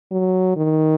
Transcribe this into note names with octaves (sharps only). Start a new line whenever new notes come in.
F#3
D#3